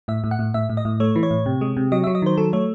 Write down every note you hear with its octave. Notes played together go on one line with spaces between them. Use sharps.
A2 E5
A2
F#5
A2
A2 E5
A2
D#5
A2
A3 C#5
E3
C#5
A2
C3
G#3
C3
F#3 D#5
E5
F#3
D#5
D#3 C5
F#3 A4
A3 C#5